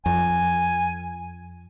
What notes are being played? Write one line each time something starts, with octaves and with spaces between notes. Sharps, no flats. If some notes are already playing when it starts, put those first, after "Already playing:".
F2 G#5